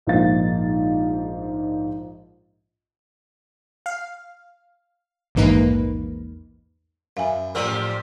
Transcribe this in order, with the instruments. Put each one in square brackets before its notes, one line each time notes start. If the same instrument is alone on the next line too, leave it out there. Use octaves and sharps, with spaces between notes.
[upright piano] A#1 G#2 F3 A#3 F5 A6
[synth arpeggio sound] F5
A#1 E2 G#2 A#3 D#4 B4
[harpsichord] F#2 [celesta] E5 B5 [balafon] F5 G#5
[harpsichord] A1 A#4 [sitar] A#2 F3 G3 [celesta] F4 E6